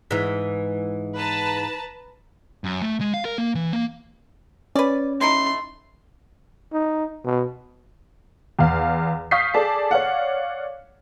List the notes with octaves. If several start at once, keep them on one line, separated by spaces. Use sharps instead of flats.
G#2 E3
B4 A5 A#5
F#2
A3
G#3
F5
A#4
A#3
E3
A#3
C#4 B4 D5
A3 D#4 E4 C6
D#4
B2
E2 F5
F5 C#6 D#6 G6 B6 C7
G#4 A4 D5 A5
C#5 D5 F5 F#5